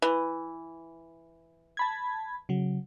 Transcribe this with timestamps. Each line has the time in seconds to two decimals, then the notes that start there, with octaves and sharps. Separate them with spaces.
0.02 E3
1.77 A5 B5 G#6
2.49 C#3 F#3